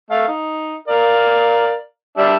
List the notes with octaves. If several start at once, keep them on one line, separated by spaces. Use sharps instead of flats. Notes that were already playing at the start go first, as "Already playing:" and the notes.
A3 F5
D#4
A#4 D5 F5
G3 D4 E5